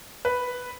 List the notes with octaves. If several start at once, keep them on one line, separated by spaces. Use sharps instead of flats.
B4